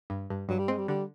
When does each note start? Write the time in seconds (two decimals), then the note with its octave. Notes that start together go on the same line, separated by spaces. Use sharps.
0.10 G2
0.30 G2
0.49 G2 F#3
0.59 G3
0.68 G#3 C4
0.78 G3
0.88 D3 G3